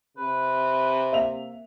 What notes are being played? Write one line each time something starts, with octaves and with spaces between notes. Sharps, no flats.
C3 B4
A#3 E5 F7